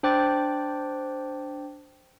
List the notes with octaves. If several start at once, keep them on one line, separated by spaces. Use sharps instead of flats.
D4 C5 G5 D6 F#6 A6